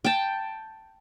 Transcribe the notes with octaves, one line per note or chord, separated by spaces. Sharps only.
G5 A5